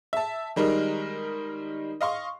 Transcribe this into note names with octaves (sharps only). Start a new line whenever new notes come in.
E5 A5
D#3 G3 G#3 D#4 A#4
D#5 F5 C6 C#6